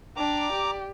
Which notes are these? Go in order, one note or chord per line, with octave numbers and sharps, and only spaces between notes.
D4 D5 G5 A#5 D6
G4